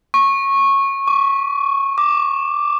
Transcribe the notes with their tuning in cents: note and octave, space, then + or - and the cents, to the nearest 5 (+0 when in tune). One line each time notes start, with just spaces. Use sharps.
C#6 -15
C#6 +40
D6 +5